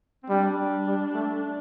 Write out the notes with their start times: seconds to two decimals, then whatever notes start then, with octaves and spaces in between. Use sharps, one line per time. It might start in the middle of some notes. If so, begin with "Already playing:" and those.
0.23 C4
0.29 G3 D4
0.86 G3
1.14 A3
1.43 D4